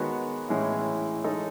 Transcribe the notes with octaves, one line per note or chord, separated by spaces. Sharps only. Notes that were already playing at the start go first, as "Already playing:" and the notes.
Already playing: D#3 G#3 B3 F#4 C#5
A2 E3 G#3 C#4 E4
E3 G#3 D#4 A4 C#5